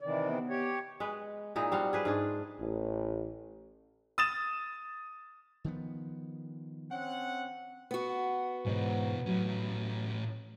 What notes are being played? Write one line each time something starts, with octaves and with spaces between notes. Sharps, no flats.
C3 D#3 E3 D5
B3
G4 C#5
G#3 B4
A#2 G#3 D#4 E4
G3 C4 F5 F#5
G#4 B4 C5
G#2 D4 G#4
A1
D#6 A6 E7
D#3 F3 B3
C4 C#4 F#5
B3 F#4
G#2 B2 E3 B4 C#5
A2 F#3 C#4